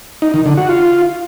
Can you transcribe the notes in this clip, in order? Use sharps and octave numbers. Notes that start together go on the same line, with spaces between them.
D#4
D#3
D3
F#4
F4